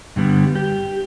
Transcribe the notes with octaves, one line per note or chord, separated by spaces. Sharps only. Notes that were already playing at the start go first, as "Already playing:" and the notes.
G2 D3 G3 B3
G4